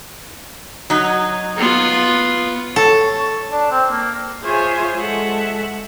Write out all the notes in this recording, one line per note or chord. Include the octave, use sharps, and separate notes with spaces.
F#3 D#4
B3 F4
A4 C#5
D4
C4
A#3
F4 G#4 C5 C#5 E5 G#5
G#3 A4 E5 F#5